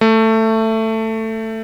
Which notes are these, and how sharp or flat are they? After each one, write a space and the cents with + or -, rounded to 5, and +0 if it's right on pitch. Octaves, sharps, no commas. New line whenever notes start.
A3 +15